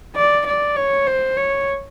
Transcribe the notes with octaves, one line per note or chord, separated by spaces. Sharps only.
D5
D5
C#5
C5
C#5